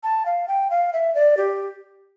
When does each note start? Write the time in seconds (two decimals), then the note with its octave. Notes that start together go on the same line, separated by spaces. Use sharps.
0.03 A5
0.26 F5
0.48 G5
0.70 F5
0.93 E5
1.15 D5
1.37 G4